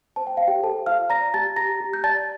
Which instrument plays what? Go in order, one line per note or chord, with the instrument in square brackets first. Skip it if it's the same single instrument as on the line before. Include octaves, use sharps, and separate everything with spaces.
[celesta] C5 A5
G5
C5 F5
G4 G5
A4 C5 A5
F4 F5 F6
D5 A#5 A#6
G4 A5 A6
G4 A#5 A#6
G4
G6
D5 A5 A6